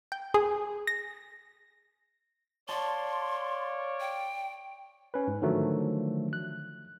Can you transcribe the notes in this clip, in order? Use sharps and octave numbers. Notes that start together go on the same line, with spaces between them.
G5
G#4
A#6
C#5 D5 F5 A5 C6
G5
C#4 B4
G#2
D3 D#3 F3 F#3 A3
F#6